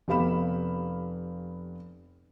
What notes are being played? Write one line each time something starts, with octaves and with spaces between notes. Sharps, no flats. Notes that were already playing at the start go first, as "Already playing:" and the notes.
F1 B3 G4 F5 B5 E7